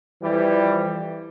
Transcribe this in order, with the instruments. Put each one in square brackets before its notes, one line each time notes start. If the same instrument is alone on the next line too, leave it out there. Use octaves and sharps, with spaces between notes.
[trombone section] F2 E3 G3